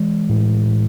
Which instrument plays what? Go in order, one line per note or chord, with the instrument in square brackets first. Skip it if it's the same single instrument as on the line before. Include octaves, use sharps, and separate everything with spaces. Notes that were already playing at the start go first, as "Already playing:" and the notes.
Already playing: [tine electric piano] E3 G#3
A2
A2